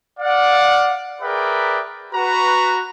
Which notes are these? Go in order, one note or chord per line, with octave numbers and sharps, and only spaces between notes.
D5 F5 F#5
G#4 A#4 B4 D5 E5 G5
F#4 B4 A#5